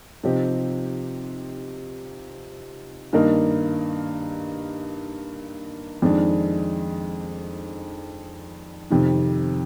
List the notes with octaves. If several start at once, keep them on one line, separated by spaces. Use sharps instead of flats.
C3 F3 C4 D#4 G4
G2 D#3 A#3 D#4 A#4
F2 D#3 G#3 D4
F2 C3 D#3